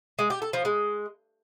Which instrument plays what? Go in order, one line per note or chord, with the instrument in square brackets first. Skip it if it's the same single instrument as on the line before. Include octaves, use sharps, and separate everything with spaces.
[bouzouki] G#3
G4
A4
F3
G#3